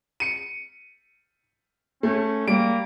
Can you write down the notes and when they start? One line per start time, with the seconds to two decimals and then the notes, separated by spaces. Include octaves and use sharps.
0.20 C#7 D#7
2.03 A3 C#4
2.47 G3 A#3 D7